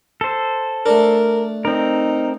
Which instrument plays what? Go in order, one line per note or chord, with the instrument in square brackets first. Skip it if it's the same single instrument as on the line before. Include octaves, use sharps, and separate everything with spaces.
[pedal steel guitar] A4 C5
[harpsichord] A3 D4 [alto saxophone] A#4
[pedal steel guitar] C4 A#4 [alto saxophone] D#4